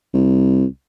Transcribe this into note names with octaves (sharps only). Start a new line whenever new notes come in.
C2